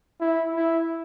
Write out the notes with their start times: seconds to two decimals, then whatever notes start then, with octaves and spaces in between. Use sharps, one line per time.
0.21 E4
0.55 E4